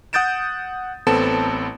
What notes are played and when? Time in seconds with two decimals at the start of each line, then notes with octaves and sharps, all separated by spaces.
0.13 F#5 D#6 G6 A6 D7 E7
1.07 A1 B3 C4 A4 A5 E7